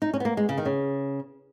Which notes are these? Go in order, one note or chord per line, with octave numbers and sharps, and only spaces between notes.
D#4
C#4
B3
A#3
G#3
C#3
D#3
C#3